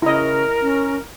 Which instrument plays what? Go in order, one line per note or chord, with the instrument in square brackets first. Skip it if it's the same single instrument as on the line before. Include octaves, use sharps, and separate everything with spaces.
[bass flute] C#3 [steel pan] E4 D#5 [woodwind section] A#4
[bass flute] C#4